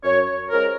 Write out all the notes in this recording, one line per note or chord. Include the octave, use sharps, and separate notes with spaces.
F#2 C#5
F3 G#3 C#4 A#4